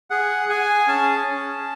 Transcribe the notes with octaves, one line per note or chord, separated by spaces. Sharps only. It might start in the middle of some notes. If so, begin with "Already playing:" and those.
G#4 F#5
G#4 G#5
C#4 A5
C#4